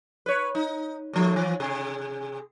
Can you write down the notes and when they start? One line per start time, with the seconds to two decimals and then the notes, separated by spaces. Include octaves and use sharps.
0.26 B4 C#5
0.55 D#4
1.13 D#2 F3 A3
1.36 E3 F3
1.60 C3 G#4